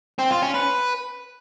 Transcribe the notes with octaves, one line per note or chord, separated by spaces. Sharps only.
C4
F4
C#4
B4